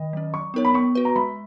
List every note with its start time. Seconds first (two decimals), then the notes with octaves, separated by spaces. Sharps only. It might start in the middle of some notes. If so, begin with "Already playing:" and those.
Already playing: D#3 D#5
0.13 F#3 C#4
0.34 F#3 C#6
0.54 B3 D#4 A#4 C#5
0.65 B5
0.74 B3 C#6
0.95 F#4 B4
1.05 A#5
1.16 G#3 B5